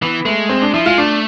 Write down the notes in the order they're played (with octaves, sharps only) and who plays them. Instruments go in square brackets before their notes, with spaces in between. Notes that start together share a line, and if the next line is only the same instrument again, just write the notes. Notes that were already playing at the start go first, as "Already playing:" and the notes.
[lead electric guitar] E3 [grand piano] B3
[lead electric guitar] G#3 [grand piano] A3
[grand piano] C4
D4
[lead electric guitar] F3 [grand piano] E4
[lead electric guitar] G#3 [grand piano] F4
[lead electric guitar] A3 [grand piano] D4